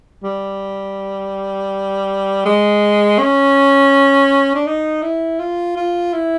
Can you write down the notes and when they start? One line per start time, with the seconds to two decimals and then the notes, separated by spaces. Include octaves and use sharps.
0.24 G3
2.45 G#3
3.19 C#4
4.55 D4
4.67 D#4
5.02 E4
5.39 F4
5.76 F4
6.13 E4